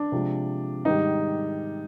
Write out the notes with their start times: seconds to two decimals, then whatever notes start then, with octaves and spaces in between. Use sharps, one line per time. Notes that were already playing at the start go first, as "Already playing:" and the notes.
Already playing: D4
0.12 C3 F3 G#3
0.85 G#2 D#3 G3 D#4